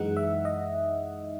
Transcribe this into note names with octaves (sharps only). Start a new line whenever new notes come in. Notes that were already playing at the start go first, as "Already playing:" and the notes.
Already playing: F#2 E3 G#3 D#4 F#5
E5
D#5